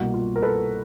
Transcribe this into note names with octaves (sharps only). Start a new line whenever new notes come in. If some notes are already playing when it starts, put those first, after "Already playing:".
Already playing: C2 B2 G3 A#3 F#4
F4
A#4
A4 B4